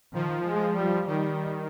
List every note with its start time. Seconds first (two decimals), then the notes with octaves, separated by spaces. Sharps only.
0.13 D#3 F3
0.45 G#3
0.76 G3
1.07 D#3 G3